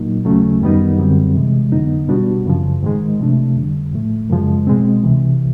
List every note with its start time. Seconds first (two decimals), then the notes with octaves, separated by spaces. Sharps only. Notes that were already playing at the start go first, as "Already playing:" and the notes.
Already playing: A#2 F#3 A#3 D#4
0.25 D#2 C#3 F#3 A3 C#4
0.61 F#2 D#3 G3 B3 D#4
0.98 F#2 D3 G3 C4
1.35 C3 E3 G#3
1.72 F2 D3 F#3 B3 D#4
2.08 B2 G3 B3 D4 F#4
2.46 F#2 C#3 F3
2.83 G#2 D#3 G#3
3.19 C3 F3 A3 D4
3.56 F2 D3 G3
3.93 A2 F3 A3
4.30 F#2 C#3 F3 G#3
4.67 B2 G#3 C4
5.03 C#2 C3 E3